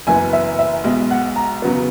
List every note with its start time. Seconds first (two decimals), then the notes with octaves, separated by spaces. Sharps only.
0.07 F#1 F#2 E3 B3 G#5
0.33 E5
0.59 E5
0.84 B1 B2 G#3
1.11 F#5
1.36 A#5
1.62 E2 C#3 F#3 B3